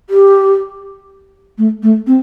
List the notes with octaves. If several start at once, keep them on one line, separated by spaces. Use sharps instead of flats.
G4
A3
A3
C4